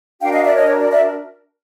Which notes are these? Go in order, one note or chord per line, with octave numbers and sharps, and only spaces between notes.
D4 F#4 A#4 F5 G5
D#5 F5
D5 E5
C#5 D#5
C#5
D5
D5 E5